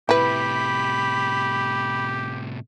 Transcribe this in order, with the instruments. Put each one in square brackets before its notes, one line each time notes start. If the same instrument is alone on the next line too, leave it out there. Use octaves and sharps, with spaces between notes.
[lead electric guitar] A2 C3 [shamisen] E4 B4 [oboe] G4 [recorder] B5